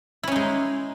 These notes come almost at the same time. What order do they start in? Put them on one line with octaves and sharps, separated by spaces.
E4 C#4 D#4 G#3